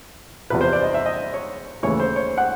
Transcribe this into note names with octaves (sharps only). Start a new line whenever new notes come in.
E2 C3 F3 B4
C5
D5
D#5
E5
D#5
C#5
D#2 C#3 E3 A3 C#5
C5
C#5
F#5